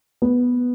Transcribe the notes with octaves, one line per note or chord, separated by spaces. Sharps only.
B3